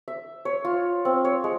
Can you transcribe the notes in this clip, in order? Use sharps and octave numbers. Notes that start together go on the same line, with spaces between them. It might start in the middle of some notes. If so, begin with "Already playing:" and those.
E5
C#5
F4
C4
C#5
G#3